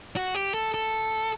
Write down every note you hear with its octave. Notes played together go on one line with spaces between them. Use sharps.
F#4
G4
A4
A4